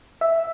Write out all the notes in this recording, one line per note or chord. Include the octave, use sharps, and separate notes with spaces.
E5